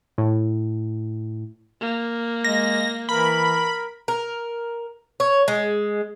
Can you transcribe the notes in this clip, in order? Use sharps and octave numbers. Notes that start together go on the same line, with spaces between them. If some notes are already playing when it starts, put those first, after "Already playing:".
A2
A#3
G#3 A#6
E3 A#4 B5
A#4
C#5
G#3